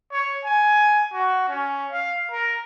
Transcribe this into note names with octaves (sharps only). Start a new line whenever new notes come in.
C#5
G#5
F#4
C#4
F5
A#4